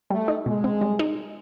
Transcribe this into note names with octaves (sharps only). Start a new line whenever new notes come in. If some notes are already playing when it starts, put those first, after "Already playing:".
G3 A3
D#4
B2 G#3
C4
G3
D#4